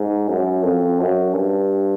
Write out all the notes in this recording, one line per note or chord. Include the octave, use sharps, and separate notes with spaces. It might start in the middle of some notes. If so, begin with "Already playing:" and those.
Already playing: G#2
F#2
F2
F#2
G2